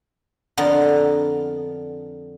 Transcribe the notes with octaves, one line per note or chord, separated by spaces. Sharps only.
F2 D3 B3 A#4